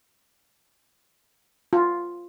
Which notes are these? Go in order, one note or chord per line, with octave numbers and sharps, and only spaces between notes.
F4